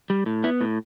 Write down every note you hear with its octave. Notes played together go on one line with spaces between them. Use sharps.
G3
A2
B3 E4
A2